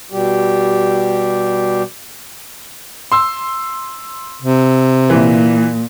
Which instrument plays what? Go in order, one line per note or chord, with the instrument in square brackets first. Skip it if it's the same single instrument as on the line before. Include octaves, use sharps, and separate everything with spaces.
[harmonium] B2 G3 G4
[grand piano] C6 E6
[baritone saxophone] C3
[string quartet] A#2 [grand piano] E3